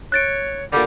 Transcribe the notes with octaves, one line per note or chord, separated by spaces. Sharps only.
C#5 F#6 A6 D7
A#2 D3 G3